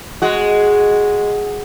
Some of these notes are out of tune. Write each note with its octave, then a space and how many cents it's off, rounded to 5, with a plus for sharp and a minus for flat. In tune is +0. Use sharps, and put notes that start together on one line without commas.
G#3 +0 F#4 +0